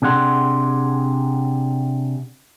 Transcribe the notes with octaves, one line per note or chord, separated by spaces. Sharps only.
C3 D4 G#4 F#5 C6